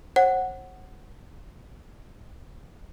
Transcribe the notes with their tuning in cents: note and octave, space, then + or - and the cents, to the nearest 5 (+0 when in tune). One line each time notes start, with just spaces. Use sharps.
C5 +40 F#5 +5